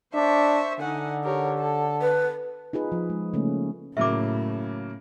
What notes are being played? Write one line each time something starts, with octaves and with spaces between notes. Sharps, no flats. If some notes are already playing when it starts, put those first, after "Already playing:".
D4 C5 E5 C#6
D3 D#4 F#5 G#5
G4 A#4 C#5
A4
B4
D#4 F4 G#4 B4
F3
G#3
C#3 A3 A#3 C#4
A2 C#3 F#3 A#3 E5 D6